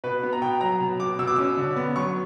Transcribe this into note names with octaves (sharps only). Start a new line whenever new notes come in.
B2 B4
B3
A#5
B2 G5
F#3 A#5
B2
B2 D6
B2 E6
D6
C#4 E6
D3
B3
F#3 C#6